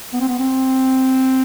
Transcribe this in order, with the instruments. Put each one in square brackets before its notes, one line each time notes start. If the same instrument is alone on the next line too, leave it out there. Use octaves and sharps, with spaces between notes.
[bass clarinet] B3
C4
B3
C4